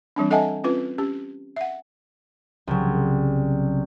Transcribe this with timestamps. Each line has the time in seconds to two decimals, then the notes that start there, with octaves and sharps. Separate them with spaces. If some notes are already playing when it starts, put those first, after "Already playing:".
0.16 E3 G3 C4 D4
0.31 A4 D#5 E5 F#5 G#5 A5
0.64 C4 C#4 F4 B4
0.98 C#4 G4
1.56 E5 F#5
2.67 C2 C#3 F#3